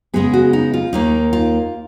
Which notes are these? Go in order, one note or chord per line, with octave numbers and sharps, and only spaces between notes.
C#3 G#3 B3 G#4
F#4
D#4
F4
D#2 D#3 A#3 D#4
F4